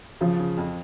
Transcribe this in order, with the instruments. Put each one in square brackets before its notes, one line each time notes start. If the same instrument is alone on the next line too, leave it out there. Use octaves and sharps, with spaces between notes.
[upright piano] C#3 [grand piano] F3
[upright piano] C#3
F2